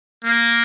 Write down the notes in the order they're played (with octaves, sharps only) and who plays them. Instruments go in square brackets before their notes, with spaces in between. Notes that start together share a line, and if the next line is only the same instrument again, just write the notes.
[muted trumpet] A#3